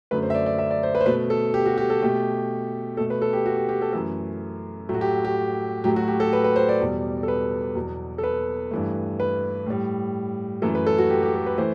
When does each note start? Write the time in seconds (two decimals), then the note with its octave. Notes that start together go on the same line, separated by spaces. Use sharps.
0.11 F#2 D3 A3 B4
0.22 C5
0.30 E5
0.35 D5
0.46 D5
0.58 E5
0.71 D5
0.83 C5
0.95 B4
1.00 C5
1.06 B2 A3 B4
1.30 A4
1.54 G4
1.66 F#4
1.78 G4
1.90 A4
2.02 B2 A3 G4
2.97 B2 A3 A4
3.10 B4
3.22 A4
3.33 G4
3.46 F#4
3.57 G4
3.69 G4
3.82 A4
3.93 F#2 E3 A3 A4
4.89 A2 F#3 A3
4.94 F#4
5.01 G4
5.25 G4
5.84 A2 F#3 A3 G4
5.96 F#4
6.08 G4
6.20 A4
6.33 B4
6.44 B4
6.56 C5
6.69 D5
6.81 E2 B2 G3
7.23 A4
7.28 B4
7.75 E2 B2 F#3
8.18 A4
8.23 B4
8.71 G2 E3 A3
9.20 B4
9.66 A2 G3
10.62 F#2 E3 A3 A4
10.75 B4
10.86 A4
10.98 F#4
11.10 G4
11.23 G4
11.34 A4
11.46 B4
11.58 E3 A3 C5